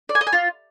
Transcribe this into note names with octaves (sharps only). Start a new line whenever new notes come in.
D5
G#5
D#5
G#5
F4